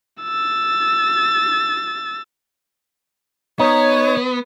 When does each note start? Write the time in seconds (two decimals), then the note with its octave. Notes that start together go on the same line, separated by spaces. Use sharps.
0.23 E6 A6
3.59 B3 D#4 C#5